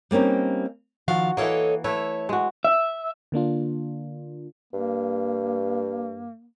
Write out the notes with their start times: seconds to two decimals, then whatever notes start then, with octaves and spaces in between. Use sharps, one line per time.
0.11 G3 A#3 C4 C#4 D#4
1.08 D#3 F3 F#4 F5
1.37 E3 A#3 A4 C#5 D#5
1.84 A3 E4 B4 C#5
2.29 G#3 F#4
2.64 E5
3.32 D3 A#3 D4 F4
4.73 G2 A#3